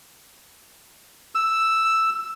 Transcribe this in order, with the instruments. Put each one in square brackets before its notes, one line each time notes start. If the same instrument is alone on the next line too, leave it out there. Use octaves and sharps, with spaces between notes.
[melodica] E6